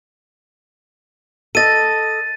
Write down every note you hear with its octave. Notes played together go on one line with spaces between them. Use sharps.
A4 D#5 A6 D#7